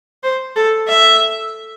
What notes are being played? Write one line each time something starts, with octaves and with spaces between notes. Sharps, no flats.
C5
A4
E5